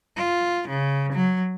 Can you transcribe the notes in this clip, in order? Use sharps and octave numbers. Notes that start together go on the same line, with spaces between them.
F4
C#3
F#3